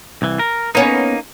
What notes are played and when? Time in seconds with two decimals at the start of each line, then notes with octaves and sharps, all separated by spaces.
0.22 C2 E3
0.39 A#4
0.75 A#3 B3 C#4 D#4